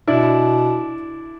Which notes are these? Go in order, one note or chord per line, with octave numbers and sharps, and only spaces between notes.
B2 D4 E4